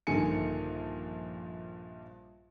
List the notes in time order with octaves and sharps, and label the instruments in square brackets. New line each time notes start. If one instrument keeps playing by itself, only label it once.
[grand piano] A#1 G2 D3 D#3 G#5 C#7